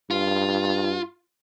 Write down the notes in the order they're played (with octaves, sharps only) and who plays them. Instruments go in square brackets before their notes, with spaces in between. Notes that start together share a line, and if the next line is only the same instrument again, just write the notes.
[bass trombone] G2 [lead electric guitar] F4